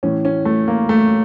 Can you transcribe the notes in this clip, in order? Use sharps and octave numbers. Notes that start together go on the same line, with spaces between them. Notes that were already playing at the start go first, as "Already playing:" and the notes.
A2 E3 C#4
C#4
A3
A#3
A3